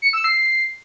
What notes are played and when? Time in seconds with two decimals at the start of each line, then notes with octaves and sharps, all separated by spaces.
0.02 C#7
0.13 E6
0.24 C7